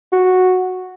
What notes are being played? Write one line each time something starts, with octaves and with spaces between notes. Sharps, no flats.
F#4